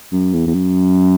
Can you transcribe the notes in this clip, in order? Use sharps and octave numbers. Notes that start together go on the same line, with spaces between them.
F#2
E2
E2
F#2